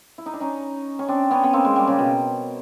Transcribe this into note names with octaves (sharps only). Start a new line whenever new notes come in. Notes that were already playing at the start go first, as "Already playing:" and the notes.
E4
D#4
D4
C#4 D#4
C#4
C4 D4
B3 C#4
B3
A#3 C4
G#3
G3
C#3
B2